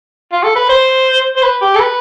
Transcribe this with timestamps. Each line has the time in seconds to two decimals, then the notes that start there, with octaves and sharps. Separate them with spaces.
0.32 F4
0.43 A4
0.56 B4
0.69 C5
1.36 C5
1.43 B4
1.62 G4
1.75 A4
1.80 B4